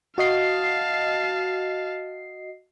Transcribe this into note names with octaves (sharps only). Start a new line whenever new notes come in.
F#4 D#5 F5 A5 C7